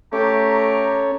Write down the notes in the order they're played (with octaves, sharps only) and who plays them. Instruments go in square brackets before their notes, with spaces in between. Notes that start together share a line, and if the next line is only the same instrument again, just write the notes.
[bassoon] A3 [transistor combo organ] C#4 A4 C#5 [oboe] G4 [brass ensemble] A#5